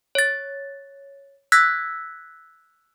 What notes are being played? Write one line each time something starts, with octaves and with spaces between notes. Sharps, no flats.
C#5 A6
E6 F#6 G#6 A#6 B6